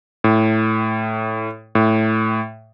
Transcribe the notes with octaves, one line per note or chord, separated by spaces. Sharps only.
A2
A2